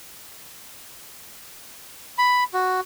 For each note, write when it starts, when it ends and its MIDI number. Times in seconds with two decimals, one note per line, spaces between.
2.18 2.44 83
2.54 2.80 66